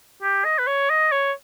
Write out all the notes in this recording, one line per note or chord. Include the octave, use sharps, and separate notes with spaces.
G4
D#5
B4
C#5
D#5
C#5